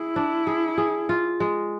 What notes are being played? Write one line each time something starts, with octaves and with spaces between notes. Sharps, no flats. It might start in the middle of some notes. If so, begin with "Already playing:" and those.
Already playing: E4 G#4
D4
G#4
G#4
F4
G#3